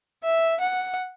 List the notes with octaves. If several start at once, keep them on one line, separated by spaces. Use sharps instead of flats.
E5
F#5